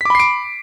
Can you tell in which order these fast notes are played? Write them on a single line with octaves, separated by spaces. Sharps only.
B6 D6 B5 C7 D7